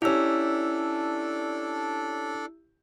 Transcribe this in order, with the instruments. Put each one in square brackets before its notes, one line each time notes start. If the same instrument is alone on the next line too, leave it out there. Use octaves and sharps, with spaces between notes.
[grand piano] C#4 G4 [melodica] D4 A4 D5 [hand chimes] E4 E6